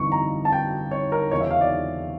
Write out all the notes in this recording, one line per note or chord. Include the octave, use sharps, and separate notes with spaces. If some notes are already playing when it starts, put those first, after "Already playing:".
Already playing: G1 F2 E3 C#6
A#5
A5
G5
C#5
A#4
E1 E2 C#3 F3 C#5
E5
F5
D5